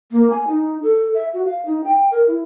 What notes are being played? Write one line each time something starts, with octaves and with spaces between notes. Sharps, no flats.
A#3
G#5
D#4
A4
E5
F#4
F5
D#4
G5
A#4
E4